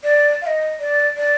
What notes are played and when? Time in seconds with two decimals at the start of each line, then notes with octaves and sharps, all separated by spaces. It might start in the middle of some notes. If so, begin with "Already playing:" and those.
0.04 D5
0.42 F5
0.47 D#5
0.80 D5
1.17 D5